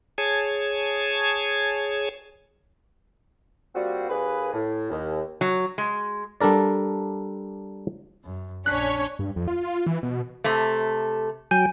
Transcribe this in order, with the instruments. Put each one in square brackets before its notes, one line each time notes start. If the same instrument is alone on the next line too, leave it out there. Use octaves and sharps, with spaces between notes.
[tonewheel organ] G#4 C#5 G#5 A5
[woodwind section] G3 A#3 C4 F4 F#4
D#2 A#3 G#4 B4
A2
D#2
[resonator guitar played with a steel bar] F#3
G#3
[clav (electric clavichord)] G3 D4 A4 A#4 D5
[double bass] F#2
[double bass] A#1 D4 [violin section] C#4 C#5 [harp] F#6 B6
[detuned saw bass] G2
F2
F4
E3
B2
[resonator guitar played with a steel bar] C3 A3
[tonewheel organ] F#3 G5 [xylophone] G#5